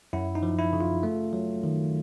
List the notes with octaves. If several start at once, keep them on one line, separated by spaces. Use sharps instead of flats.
F#2 E4
D#4
F3
E4
C#3
F4
A3
F#3
D#3